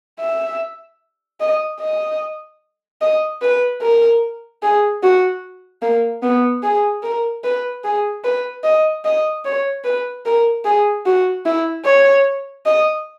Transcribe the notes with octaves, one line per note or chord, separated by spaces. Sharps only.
E5
D#5
D#5
D#5
B4
A#4
G#4
F#4
A#3
B3
G#4
A#4
B4
G#4
B4
D#5
D#5
C#5
B4
A#4
G#4
F#4
E4
C#5
D#5